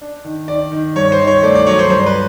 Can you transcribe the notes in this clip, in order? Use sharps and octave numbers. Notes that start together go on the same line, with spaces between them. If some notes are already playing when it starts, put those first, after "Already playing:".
D4
D#3
D#3 D5
D#3
G2 C#5
C5
D#3
C#5
A3 D5
D5
F#3 C#5
C5
G2 C5
B4